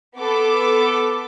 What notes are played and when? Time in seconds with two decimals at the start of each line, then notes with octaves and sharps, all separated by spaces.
0.17 B3 A4 D6